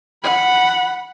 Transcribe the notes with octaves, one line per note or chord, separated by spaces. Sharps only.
F#5 B5